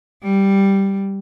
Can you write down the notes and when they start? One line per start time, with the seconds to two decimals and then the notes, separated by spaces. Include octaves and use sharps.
0.23 G3